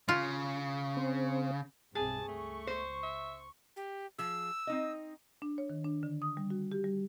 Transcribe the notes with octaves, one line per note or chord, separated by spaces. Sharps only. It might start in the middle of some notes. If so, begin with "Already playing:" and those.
C#3 F4
C4
B1 G2 C3 G#4 A5
C#2 A3 C#6
C5
E5
G4
F3 G#4 E6
C4 D#4 D#5
D4
C#5
D#3
D4
D3
D#6
G3
F#4
G4
G3